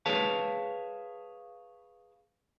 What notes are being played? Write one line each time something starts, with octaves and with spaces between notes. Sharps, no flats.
G#4 B4 C#5 F5 A5